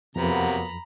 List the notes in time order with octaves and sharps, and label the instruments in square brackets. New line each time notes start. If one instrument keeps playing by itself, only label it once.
[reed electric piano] F2 [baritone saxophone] C3 [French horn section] F#3 A#3 B3 [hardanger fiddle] A#5 B5